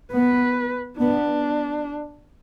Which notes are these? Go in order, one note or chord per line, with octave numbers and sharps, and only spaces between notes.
B3 B4
B3 D4